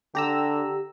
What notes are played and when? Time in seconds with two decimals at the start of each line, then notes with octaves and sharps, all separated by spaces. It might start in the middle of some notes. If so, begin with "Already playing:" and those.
0.15 D3 G4 A#5 E6